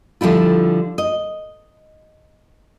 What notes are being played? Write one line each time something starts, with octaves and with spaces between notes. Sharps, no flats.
D3 F3 G3 E4 F4
D#5